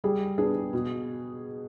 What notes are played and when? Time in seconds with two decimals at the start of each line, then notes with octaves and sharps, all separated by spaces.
0.04 G3 G#4
0.38 B3 D4 G#4
0.73 B2